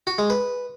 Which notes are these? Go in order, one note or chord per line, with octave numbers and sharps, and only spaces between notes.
F#4
G#3
B4